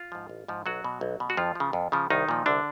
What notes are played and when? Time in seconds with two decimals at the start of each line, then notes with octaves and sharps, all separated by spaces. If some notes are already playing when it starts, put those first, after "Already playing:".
Already playing: F4
0.12 G#2 F3
0.29 A1
0.48 G#2 F3
0.66 B1 F#3 F#4
0.84 B2
1.01 B1
1.20 B2
1.30 F#4
1.37 F2 F3 F4
1.55 C#3 F3
1.73 F2
1.92 C#3 F3
2.10 C2 D#3 D#4
2.29 A#2 F3
2.46 C2 D3 D4